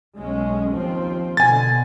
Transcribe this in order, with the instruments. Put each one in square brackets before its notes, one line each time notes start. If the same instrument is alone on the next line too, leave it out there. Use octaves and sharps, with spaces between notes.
[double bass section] B1 G#3 C#4
D#2 F3 C4
[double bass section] B2 D3 [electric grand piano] G#5 A6